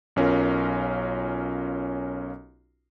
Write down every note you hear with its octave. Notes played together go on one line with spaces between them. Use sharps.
B1 C#4 F4 A#4